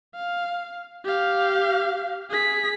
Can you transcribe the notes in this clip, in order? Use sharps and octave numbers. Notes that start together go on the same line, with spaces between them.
F5
G4 F5
G#4 B6